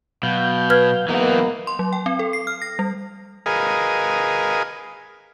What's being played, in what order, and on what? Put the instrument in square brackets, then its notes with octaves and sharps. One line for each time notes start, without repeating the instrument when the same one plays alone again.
[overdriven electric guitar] B2 [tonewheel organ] F#3 F5 G6
[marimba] B4 F6 G#6
[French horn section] G#2 A#3 B3 [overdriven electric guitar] E3 D#4 [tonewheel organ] F#3
[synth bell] C6
F#3
G5
C4
A4
C7
F6
A#6
G3
[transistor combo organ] G#4 A#4 B4 D#5 F5 G#5